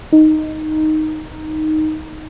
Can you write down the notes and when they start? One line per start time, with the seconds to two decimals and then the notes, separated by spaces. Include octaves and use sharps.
0.13 D#4